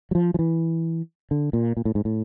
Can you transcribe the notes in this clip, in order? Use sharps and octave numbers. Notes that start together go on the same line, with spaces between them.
F#3
F3
F3
E3
D3
A#2
A#2
A2
G#2
A2